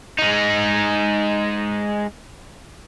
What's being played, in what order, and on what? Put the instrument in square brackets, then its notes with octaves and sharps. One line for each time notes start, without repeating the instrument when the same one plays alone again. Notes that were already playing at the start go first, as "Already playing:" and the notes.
[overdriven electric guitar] G#3 D#4